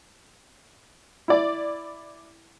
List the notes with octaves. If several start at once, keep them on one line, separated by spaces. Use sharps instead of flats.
E4 D5